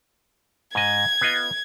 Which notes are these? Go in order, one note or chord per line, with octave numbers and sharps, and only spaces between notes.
G#2 D#5 G#6
B3 F4 D#5